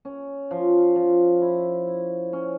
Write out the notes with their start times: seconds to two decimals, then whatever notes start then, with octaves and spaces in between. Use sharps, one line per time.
0.05 C#4
0.51 F3
0.96 F3
1.42 E4
1.87 E4
2.33 C#4